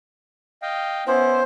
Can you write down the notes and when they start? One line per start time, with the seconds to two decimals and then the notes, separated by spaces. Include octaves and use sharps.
0.62 D#5 F5 G5
1.07 B3 C#4 E4 C5